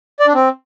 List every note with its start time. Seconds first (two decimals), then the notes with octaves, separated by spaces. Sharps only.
0.19 D5
0.27 D4
0.34 C4